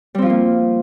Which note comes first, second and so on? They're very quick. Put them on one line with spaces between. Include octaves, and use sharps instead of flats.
G3 C4 F3 F4 A#3